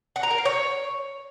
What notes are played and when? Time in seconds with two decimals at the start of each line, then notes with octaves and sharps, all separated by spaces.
0.16 F#5
0.23 A#5
0.31 A#4
0.38 F5
0.45 C#5